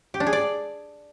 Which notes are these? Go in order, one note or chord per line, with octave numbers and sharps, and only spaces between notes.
G4
D4
G#4
D5